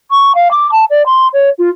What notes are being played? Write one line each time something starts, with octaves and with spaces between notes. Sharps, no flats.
C#6
F5
D6
A5
D5
C6
C#5
F4